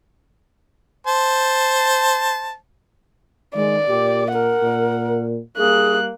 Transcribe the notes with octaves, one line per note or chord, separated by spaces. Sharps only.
C5 A5
D#3 G#3 D5
A#2 G4
A#4 F#5
A#2
G3 A#3 G#4 F#6